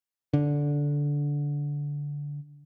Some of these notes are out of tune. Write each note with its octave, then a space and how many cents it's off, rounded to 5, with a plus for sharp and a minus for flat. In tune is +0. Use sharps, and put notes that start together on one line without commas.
D3 -15